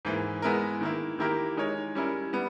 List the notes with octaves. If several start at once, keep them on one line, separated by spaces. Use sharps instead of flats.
G#2 E3 A#3
G#3 B3 E4 A#4
D#3 A#3 E4
D#3 A#3 E4 G4 A#4
G#3 D#4 A#4 C#5
G3 C#4 E4 A#4
G3 B3